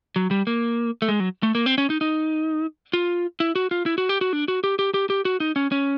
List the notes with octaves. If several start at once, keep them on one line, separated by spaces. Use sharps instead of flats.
F#3
G3
A#3
A3
G#3
F#3
A3
A#3
C4
C#4
D#4
D#4
F4
E4
F#4
F4
E4
F#4
G4
F#4
D4
F#4
G4
G4
G4
G4
F#4
D#4
C#4
C#4